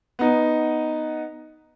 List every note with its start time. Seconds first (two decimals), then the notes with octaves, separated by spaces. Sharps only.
0.19 B3 D#4